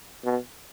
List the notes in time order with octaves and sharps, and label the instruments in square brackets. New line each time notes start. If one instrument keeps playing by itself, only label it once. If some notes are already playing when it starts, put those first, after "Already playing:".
[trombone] B2